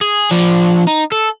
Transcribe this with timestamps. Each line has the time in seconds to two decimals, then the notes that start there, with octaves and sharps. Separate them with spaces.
0.01 G#4
0.31 F3 D4
0.87 D#4
1.12 A4